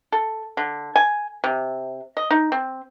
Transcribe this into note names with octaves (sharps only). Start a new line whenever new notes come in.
A4
D3
G#5
C3
D#5
D#4
C4